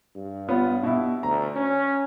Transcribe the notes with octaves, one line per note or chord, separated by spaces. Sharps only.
G2
B3 F4 C#5
B2 E4
D2 A#5
C#4